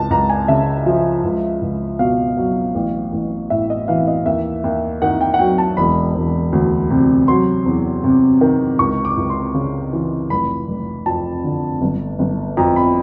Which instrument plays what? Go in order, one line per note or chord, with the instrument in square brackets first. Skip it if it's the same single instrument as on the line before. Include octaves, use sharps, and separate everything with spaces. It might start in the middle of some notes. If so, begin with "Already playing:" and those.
Already playing: [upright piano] C#2 A5
C#2 A#5
G#5
C#3 E5
F3
C#2
C#2
B2 F5
F#3
A1
A1
A2 E5
D#5
E3 F5
D#5
D#2 E5
D#2
D#3 F#5
G5
F#5
F#3 G5
A5
E1 B5
E1
D2
C3
F#3 C6
E2
C3
D#3
C#2 C#6
D6
C#2
C6
C#3
E3
F1 B5
F1
F2 A5
D3
G1
G1
F2 A#5
B5